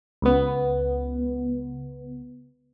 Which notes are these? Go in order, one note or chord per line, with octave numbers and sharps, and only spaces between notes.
C#2 B3